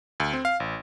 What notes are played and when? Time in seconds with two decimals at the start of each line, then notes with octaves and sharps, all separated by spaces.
0.20 D2
0.33 C4
0.45 F5
0.60 A1